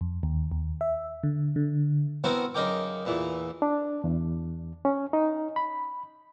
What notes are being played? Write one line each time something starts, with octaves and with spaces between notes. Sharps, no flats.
F2
D#2
D#2
E5
D3
D3
B3 C4 E4 F#4 A#4 C5
F#2 C#3 D#4 A#4 G5 D6
E2 A#2 E3
D4
E2
C#4
D#4
B5